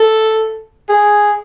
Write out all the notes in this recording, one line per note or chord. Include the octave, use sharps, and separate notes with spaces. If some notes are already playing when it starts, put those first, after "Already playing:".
Already playing: A4
G#4